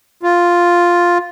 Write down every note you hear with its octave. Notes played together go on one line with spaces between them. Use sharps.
F4